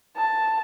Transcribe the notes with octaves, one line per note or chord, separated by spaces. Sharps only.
A5